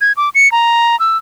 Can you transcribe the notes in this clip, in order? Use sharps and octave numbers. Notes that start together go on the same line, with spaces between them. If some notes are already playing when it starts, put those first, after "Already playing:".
G#6
D6
C#7
A#5
E6